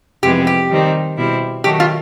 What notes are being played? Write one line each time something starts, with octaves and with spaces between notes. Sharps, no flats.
F2 C3 E3 G#3 B3 G4
G4
D#3 G3 C4 D#4
B2 G3 C4 E4
D#3 F#3 A3 G4
F4